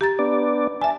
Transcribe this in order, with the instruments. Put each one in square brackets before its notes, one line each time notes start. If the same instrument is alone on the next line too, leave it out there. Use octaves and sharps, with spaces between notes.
[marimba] G4 A#5 A6
[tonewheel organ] B3 D4 D5
[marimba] E5 G#5 [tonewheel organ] A5